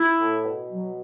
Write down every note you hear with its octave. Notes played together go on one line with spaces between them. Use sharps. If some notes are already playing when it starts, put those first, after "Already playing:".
Already playing: E4
A2
B2
F#3